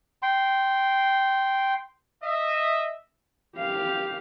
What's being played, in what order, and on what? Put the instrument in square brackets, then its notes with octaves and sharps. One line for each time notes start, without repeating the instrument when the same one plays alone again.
[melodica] G5 C6
[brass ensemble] D#5 E5
[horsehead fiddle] G4 F5